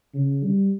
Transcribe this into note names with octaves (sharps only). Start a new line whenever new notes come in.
C#3
G3